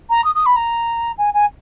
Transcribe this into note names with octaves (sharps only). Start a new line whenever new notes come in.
A#5
D#6
D#6
B5
A#5
G#5
G#5